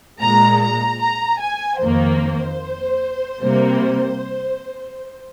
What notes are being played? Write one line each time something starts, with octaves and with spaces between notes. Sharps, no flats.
A#2 G#3 A#5
A#5
A#5
G#5
F2 D#3 A#3 C5
C3 G3 A#3